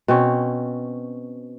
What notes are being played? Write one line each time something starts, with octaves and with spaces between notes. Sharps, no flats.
B2 C4 C#4